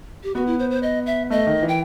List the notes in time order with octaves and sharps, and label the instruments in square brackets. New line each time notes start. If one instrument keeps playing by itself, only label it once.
[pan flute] G4
[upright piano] B3 [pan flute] F#4
[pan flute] E4
C5
C5
D#5
E5
[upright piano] A3 [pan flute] D#5
[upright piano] D#3
E3
[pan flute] G5